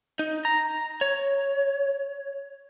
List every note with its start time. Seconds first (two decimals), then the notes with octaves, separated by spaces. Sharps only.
0.19 D#4
0.45 A#5
1.01 C#5